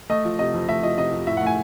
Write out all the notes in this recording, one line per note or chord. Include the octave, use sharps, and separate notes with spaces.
A3 D#5
F3
C3 D#5
F2
A3 E5
F3 D#5
C3 D#5
F2
A2 E5
F#5
A3 G#5